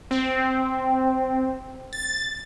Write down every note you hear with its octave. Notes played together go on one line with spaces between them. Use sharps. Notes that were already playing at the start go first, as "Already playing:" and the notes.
C4
A6